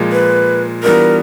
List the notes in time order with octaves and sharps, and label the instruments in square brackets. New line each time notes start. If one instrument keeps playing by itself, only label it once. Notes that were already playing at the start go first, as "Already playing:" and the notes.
Already playing: [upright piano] A#2 F3 G#3
[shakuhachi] B4
[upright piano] E3 G3 B3 D4 F4 [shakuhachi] A#4